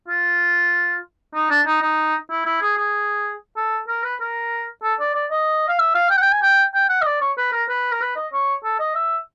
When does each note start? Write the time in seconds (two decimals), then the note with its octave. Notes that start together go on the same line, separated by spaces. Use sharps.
0.08 F4
1.35 D#4
1.50 D4
1.67 D#4
1.82 D#4
2.31 E4
2.46 E4
2.62 G#4
2.78 G#4
3.57 A4
3.88 A#4
4.04 B4
4.21 A#4
4.83 A4
5.00 D5
5.15 D5
5.31 D#5
5.69 F5
5.79 E5
5.95 F5
6.10 G5
6.17 F#5
6.22 G5
6.32 G#5
6.42 G5
6.74 G5
6.89 F#5
7.02 D#5
7.06 D5
7.21 C#5
7.37 B4
7.53 A#4
7.69 B4
7.92 A#4
8.01 B4
8.16 D#5
8.33 C#5
8.64 A4
8.79 D#5
8.95 E5